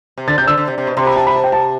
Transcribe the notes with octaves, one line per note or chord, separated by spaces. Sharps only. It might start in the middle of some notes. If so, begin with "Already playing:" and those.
C3
D3 A6
C3 G6
D3 E6
D3
C3
C3
B2
C3 C6
B5
A5
B5
A5
G5
A5